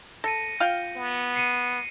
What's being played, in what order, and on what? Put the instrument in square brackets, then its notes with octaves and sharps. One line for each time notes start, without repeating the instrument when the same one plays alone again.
[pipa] A4 [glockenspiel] A#6 C#7 D#7
[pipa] F4 F5 G5
[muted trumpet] B3
[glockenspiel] C7 C#7 D#7